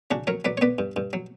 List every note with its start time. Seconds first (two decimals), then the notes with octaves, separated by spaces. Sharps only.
0.11 C#3 D4 F#4
0.27 F#3 A#4 C#5
0.45 F#3 B4 D5
0.57 C#5
0.61 B3 B4 D5
0.79 G2
0.96 G2
1.13 F#3